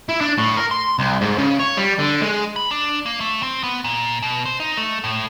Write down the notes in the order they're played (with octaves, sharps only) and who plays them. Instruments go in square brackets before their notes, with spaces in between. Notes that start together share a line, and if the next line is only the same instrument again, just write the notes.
[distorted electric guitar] E4
D4
A2
A#4
C6
C2
G#2
C#3
C#5
G3
D3
G#3
[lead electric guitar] B5
D4
A#3
A3
C4
B3
A#2
B2
C5
D#4
A3
A2